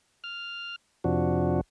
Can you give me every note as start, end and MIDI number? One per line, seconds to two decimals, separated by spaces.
0.24 0.76 89
1.04 1.61 41
1.04 1.61 48
1.04 1.61 53
1.04 1.61 62
1.04 1.61 66